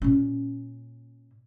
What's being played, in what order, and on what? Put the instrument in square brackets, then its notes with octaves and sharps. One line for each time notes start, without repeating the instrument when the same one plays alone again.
[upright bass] A#2 C#4